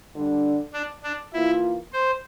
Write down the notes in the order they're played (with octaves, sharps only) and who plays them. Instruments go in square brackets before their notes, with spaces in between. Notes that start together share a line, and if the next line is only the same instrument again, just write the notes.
[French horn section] D3 G3 D4
[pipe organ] D4
D4
[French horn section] E3 A#3 F4 [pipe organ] E4
[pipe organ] C5